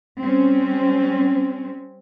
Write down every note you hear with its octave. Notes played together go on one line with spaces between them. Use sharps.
G3 C4 C#4